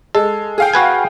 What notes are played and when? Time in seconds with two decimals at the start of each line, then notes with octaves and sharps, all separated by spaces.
0.15 G#3 A4
0.58 G#4 F5 G5
0.73 F#4 B4 G#5